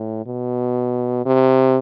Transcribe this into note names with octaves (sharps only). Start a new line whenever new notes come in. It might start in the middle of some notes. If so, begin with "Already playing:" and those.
Already playing: A2
B2
C3